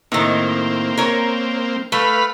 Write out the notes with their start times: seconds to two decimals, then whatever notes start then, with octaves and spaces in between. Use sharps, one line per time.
0.12 A2 D#3 A#3 C4
0.98 A#4 C#5
1.92 A3 B4 F5 B5